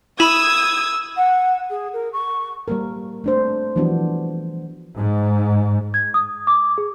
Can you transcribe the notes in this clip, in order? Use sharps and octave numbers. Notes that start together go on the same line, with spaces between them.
E4 B5 D#6 E6 G#6 D#7 E7
F#5
G#4
A#4
C#6
G3 A#3 A#4
A3 D4 C5
E3 F3 G3 B3 D4 F#4
G#2
G#6
D#6
D6
G#4